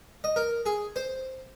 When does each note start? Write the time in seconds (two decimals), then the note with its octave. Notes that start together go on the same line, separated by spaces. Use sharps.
0.24 D#5
0.36 A#4
0.66 G#4
0.96 C5